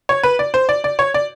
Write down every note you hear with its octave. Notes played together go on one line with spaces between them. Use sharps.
C#5
B4
D5
C5
D5
D5
C#5
D5